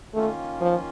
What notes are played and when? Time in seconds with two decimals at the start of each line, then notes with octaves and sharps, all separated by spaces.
0.13 D#3 A3 A#3 C#4 F4
0.61 F3